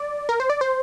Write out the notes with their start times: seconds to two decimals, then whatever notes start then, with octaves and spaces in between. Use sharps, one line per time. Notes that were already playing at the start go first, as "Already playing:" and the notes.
Already playing: D5
0.29 A#4
0.40 C5
0.50 D5
0.61 C5